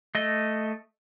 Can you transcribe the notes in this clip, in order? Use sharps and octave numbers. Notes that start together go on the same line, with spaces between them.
A3 D#5